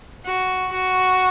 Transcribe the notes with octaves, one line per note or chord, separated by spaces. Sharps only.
F#4
F#4